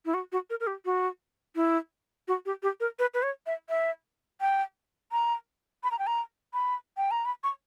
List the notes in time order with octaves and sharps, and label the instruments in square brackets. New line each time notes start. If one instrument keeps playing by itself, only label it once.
[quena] E4
F#4
F#4
A#4
A#4
G4
F#4
E4
F#4
G4
G4
A#4
B4
B4
C#5
E5
E5
G5
A#5
B5
A#5
G5
A#5
B5
G5
A#5
B5
C#6